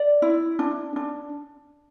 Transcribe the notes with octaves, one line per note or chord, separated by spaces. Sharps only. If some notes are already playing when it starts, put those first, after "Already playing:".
Already playing: D5
E4
D4
D4